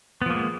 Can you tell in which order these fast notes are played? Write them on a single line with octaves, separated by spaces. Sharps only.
B3 F3 A#3 G#3